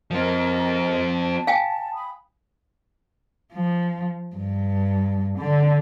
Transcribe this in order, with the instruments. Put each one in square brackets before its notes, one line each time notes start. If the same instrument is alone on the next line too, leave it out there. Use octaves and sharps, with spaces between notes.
[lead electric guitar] F3 C4 [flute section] G4 A#4 D#5
[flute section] A5
[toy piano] F5 G5 G#5
[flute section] B5 D#6
[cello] F3
G2
D3